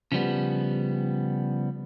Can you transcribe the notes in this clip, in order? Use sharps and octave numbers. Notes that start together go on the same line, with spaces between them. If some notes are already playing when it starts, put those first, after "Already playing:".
C#3 F3 G3 B3